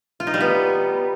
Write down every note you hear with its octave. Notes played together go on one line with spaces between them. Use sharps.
F4
D#4
G3
B3